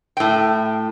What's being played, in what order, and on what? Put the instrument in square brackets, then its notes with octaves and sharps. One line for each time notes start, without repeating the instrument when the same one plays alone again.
[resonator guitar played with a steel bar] A2 G5